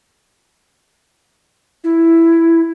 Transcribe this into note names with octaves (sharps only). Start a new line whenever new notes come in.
E4